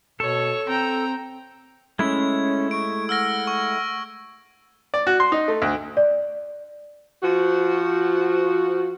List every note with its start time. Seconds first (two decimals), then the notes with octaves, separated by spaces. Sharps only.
0.20 B2 A4 C#5 C#6
0.68 C4 G5 A#5
1.99 G#3 A3 C#4 E4 G#6
2.71 C#6 D7
3.09 F#5 E6 F6 A#6
3.47 C#6
4.94 D5
5.07 F#4
5.20 C6
5.32 D#4
5.48 A3
5.62 D2
5.97 D5
7.23 F3 F#4